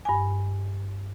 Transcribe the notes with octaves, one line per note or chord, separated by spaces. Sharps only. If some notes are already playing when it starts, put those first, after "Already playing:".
G2 G#5